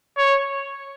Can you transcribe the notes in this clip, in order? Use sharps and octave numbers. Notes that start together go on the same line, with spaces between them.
C#5